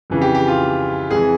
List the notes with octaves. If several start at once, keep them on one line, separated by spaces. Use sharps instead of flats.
F2 C#3 E3
G4
G4
F4
F2 E3 G#4